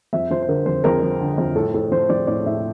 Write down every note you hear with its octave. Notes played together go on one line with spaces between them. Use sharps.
F2 E5
F3 C5
C5
D3 A#4
F2 C5
F2 A#4
F3
D3
F2
A2 A4
A2 A4
F3 C5
F3 D5
A2 D5
A2 E5